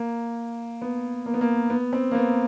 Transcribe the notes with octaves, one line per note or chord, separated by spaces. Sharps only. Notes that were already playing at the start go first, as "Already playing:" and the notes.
Already playing: A#3
B3
A#3
B3
A#3
B3
C4
A#3
B3